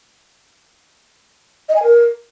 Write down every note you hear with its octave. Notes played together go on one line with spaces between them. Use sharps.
D#5
G#5
A#4